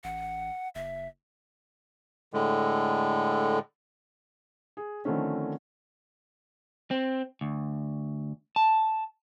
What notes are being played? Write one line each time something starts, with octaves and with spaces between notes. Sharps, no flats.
A1 F#5
F#1 E5
A2 D3 G#3
G#4
D3 D#3 F3 A3 C4 C#4
C4
D2
A5